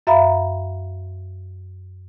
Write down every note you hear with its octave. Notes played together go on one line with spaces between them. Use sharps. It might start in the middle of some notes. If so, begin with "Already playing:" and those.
F#2 E5 F5 A#5 B5